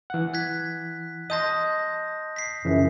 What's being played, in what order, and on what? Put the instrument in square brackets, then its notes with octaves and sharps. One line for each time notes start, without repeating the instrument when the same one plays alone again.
[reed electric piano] E3 F#5
[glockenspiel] F#6 G#6 B6
[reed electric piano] D#5 A5 C6 [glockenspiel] D#6 G6 A#6
[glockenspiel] B6 C7
[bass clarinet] F#2 [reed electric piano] C#3 E3 F3